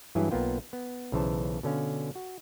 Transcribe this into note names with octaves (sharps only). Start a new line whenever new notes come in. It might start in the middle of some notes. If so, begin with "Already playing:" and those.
G2 E3 F#3 E4 G#4
B1 A#3 B3 F4 G5
B3
B1 C#3 E3 C5 A5
B2 D3 C#4 F5
F#4